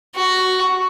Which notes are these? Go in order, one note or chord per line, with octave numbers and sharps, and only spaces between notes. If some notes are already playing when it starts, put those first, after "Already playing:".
F#4